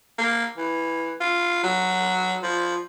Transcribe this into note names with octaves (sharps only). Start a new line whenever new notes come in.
A#3
E3
F4
F#3
F3